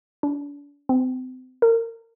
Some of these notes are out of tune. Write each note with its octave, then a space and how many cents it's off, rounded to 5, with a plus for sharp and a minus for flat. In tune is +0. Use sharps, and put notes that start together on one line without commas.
D4 -40
C4 -35
A#4 -30